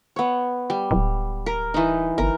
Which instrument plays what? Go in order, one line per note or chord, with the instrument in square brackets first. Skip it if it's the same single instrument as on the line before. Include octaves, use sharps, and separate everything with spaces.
[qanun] B3 C#5
G3
[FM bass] D1
[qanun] A#4
E3 D#4
[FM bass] G1 [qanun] A#4